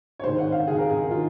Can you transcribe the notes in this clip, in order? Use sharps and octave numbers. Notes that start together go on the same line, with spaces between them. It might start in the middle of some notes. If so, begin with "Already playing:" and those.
C#5
G#2 D#3 C5
F#5
F5
G#2 D#3 G#4
A#4
G#4
D#3 F4